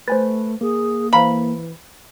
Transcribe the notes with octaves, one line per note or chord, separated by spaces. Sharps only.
A3 B4 C5 G#5 A6
A#3 G#4
E3 C5 F5 A#5 B5